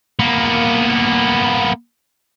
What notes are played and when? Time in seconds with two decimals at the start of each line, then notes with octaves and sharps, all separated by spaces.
0.20 A#3 B3